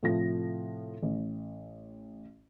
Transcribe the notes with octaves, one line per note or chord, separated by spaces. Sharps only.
A2 C3 F3 A4 A#6
A1